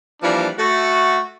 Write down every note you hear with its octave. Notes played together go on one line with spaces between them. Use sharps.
E3 F3 G3 A#3 D4
A3 F#4